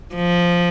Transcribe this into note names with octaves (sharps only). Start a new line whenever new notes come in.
F3